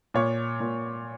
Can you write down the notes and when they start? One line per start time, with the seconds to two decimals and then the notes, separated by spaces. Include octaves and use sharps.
0.14 A#2 C#5
0.60 A#2